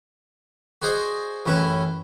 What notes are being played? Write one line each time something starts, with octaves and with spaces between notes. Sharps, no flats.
F#4 G#4 C5 D5 D#5
A1 F#2 C#4 E4 B4